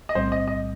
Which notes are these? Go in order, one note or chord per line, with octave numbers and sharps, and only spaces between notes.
D#5
B1 A2 G3 C4 C5
D#5
D#5